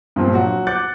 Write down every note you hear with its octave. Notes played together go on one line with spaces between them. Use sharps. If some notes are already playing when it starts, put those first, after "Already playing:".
G2 A#2 F3 C4
F#3 F#4
D6 F#6 G6 A6 C#7